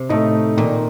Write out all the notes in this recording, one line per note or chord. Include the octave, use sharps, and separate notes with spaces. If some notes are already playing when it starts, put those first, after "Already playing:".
Already playing: C3
A2 A3 D#4
A#2 D#3